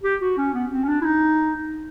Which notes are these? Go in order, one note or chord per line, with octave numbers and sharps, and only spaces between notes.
G4
F#4
C#4
B3
C4
C#4
D4
E4
D#4